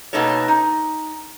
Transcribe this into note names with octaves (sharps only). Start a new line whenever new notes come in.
B2 A#3 B3 D#4 A4 C#5
D#4